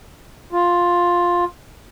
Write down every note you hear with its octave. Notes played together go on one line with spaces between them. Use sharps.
F4